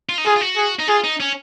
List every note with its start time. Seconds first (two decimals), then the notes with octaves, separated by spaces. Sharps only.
0.09 F4
0.18 D#4
0.26 F4 G#4
0.36 F4
0.41 F#4
0.56 G#4
0.79 D#4
0.88 F4 G#4
1.04 D#4
1.20 C#4